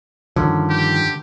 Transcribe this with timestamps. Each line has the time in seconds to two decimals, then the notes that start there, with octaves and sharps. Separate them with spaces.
0.36 G2 D3 D#3 F3 C#4
0.70 G4